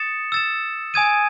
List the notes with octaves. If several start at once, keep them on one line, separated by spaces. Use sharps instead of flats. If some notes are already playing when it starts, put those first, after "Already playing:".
Already playing: D#6 A6 C#7 E7
E6 A6 E7
G#5 D#6 G#6 D#7